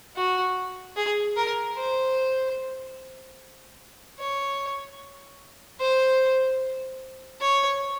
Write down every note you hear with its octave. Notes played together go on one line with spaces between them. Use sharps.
F#4
G#4
A#4
C5
C#5
C5
C#5